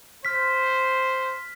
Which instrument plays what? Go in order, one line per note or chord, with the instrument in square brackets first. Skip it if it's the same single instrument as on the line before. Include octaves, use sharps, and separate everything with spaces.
[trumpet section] C5 [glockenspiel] F6 B6